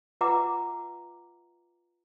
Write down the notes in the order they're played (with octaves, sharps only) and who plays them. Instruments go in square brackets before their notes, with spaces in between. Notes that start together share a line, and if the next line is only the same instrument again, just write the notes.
[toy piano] F4 B4 E5 F#5 A#5 D6